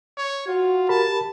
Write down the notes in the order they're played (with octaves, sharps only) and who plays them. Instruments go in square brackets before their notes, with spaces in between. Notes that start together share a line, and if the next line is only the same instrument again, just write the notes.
[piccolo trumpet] C#5
[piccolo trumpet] F4 [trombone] F#4
[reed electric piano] G4 A#4 B5 [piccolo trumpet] A5